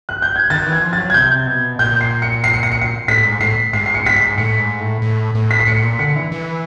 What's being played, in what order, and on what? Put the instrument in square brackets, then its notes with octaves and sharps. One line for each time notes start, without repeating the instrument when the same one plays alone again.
[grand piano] F#6
G6
G#6
[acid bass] D#3 [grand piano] A6
[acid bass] E3
[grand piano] G#6
[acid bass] F3
[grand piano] A6
[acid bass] F#3
[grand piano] G#6
[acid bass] C3 [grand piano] G6
[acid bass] B2
[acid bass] A#2 [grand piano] G6
[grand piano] C7
C#7
C7
C#7
C7
C#7
C7
[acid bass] A2 [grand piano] B6
[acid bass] G#2
[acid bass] A2 [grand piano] C7
[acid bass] G#2 [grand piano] C7
[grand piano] C7
C#7
[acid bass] G#2 [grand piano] B6
[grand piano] C7
[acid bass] A2 [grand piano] C#7
[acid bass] G#2
A2
A2
A2
[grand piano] B6
C7
[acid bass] A2 [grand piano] C#7
[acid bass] A#2
[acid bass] D3 [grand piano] C#7
[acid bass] E3
E3